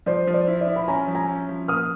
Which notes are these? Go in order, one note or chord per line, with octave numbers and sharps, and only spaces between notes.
F3 C5 D5
F3
C5 D5
E4
D5 E5
E4
B5
C#4 G#5 A#5
F3
G#5 A#5
C#4
F3
A#3 D#6 F6